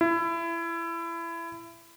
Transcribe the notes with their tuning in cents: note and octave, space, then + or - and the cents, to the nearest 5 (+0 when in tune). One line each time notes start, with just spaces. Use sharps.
E4 +25